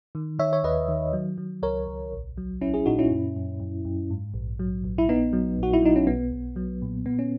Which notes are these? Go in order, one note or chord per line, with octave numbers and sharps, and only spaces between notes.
D#3
D#3 C#5 E5
C#5
D#2 B4 D#5
D#3
F#3
F#3
C#2 A#4 C#5
C#2
A#1
F#3
A#1 C#4 E4
E4 G#4
A#2 D#4 F#4
C#4 E4
F#2
F#2
F#2
F#2
G#2
A#1
F#3
A#1
E4
A#1 B3 D#4
F#3
A#1 F#4
E4
F#3 D#4
C#4
B1 B3
B1
F#3
A#2
A#2 B3
C#4